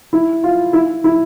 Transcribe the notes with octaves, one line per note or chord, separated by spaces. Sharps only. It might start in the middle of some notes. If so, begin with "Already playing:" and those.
E4
F4
E4
E4